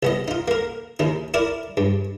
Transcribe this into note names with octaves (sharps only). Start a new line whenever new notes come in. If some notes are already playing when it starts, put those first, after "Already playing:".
C2 B3 D#5
D#4 F4
A#3 A#4
D#2 D#4
E4 A#4 D5
G2